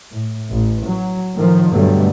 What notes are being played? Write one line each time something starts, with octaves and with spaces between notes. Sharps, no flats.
A2
A1
F#3
A2 D#3 F3
G2 B2 D3 F#3 G3 A3